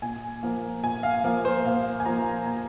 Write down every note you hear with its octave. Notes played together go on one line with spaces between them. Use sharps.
A#2 G#5
F3 A#3
A#2 G#5
F5
F3 A#3
C5
A#2 F5
G#5
F3 A#3 A#5
A#2 G#5